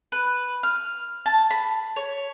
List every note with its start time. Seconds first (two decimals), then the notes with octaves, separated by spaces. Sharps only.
0.12 B4
0.63 F6
1.26 A5
1.51 B5
1.96 C#5